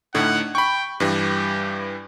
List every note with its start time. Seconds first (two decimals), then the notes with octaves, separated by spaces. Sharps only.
0.14 A2 D3 D#4 F#5
0.55 G5 B5 C#6
1.00 G2 E3 G3 G4